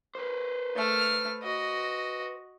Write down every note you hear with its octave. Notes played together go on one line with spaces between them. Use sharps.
B4 C5
A3 F6
F#4 D#5